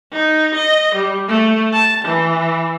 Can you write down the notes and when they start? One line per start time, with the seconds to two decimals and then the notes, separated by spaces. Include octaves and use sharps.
0.13 D#4
0.55 D#5
0.95 G3
1.29 A3
1.73 A5
2.05 E3